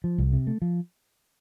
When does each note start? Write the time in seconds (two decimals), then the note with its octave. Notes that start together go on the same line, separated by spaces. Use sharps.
0.04 F3
0.18 C2
0.33 C3
0.47 A3
0.62 F3